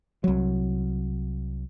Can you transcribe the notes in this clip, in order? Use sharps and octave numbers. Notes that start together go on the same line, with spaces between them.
C2 F#3